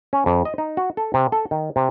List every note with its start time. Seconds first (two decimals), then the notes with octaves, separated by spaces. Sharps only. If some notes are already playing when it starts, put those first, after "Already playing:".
0.13 C#4
0.26 F2
0.45 D#5
0.58 D#4
0.77 F#4
0.97 A4
1.14 C3
1.32 A4
1.51 D#3
1.76 C3